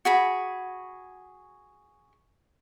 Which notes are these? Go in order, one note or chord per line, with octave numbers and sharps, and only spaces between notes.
F#4 G#4 B5